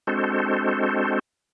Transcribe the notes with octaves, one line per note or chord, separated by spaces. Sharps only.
G#3 C4 D4 F#4 A4 C5